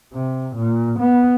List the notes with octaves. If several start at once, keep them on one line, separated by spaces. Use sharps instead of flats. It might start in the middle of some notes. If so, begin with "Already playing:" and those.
C3
A#2
B3